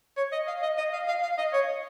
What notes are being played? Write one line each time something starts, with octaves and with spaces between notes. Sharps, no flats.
C#5
D#5
F5
D#5
D#5
F5
F5
F5
D#5
C#5